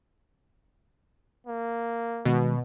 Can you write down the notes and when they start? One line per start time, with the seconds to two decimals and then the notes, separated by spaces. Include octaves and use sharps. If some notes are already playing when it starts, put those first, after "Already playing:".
1.47 A#3
2.25 B2 D#3 G#3